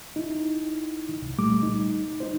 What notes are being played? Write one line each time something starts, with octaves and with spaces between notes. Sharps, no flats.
D#4 E4
C2
A#2 G3 A3 D6
D#4
D#4 C5